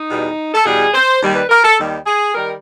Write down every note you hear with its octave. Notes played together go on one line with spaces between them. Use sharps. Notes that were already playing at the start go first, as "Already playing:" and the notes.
Already playing: D#4
E2 B2 G3
A4
E2 B2 G3 G#4
C5
D#2 D#3 G3
B4
A#4
A4
D#2 D#3 G3
G#4
D#3 G3 A#4